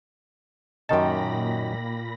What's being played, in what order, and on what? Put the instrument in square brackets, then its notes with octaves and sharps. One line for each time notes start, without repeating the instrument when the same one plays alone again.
[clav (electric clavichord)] F#2 D#3 A5 [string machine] A#2 B5 A#6 [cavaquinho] D#4 G4